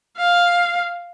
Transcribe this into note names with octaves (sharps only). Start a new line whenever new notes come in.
F5